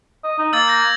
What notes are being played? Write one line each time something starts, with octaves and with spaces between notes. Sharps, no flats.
D#5
D#4
A#3 E6 A6
G6 A#6
G#6